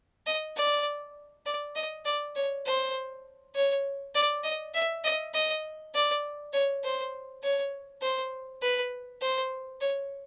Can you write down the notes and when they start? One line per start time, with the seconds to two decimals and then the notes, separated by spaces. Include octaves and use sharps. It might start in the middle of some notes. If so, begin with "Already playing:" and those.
0.26 D#5
0.56 D5
1.46 D5
1.75 D#5
2.05 D5
2.35 C#5
2.66 C5
3.55 C#5
4.14 D5
4.44 D#5
4.74 E5
5.04 D#5
5.34 D#5
5.94 D5
6.53 C#5
6.83 C5
7.43 C#5
8.02 C5
8.62 B4
9.21 C5
9.81 C#5